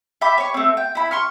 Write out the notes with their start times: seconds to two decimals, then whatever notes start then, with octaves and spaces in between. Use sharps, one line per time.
0.21 E5 G5 B5 D6
0.38 C#5 C#6
0.54 A3 C4
0.77 G5
0.95 E4 B5
1.11 C6 C#6 F6